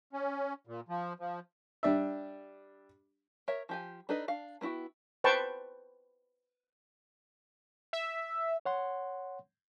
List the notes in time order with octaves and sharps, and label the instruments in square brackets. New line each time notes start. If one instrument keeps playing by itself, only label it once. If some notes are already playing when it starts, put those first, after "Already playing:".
[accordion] C#4
A#2
F3
F3
[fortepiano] G3 D4 E5
[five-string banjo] A#4 C#5 E5
F3 G4 G#5
D4 D#4 A4 B4 D#5
D4 F5
A#3 B3 E4 F#4 G5
[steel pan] B4 C5 G5 A5 C#6
[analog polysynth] E5
[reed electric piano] C#5 F#5 C6